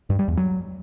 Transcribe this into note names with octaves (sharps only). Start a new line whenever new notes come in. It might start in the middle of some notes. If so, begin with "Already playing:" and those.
G2
G3
E2
F#3